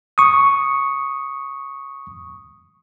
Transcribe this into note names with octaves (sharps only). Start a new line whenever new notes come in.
C#6 D#6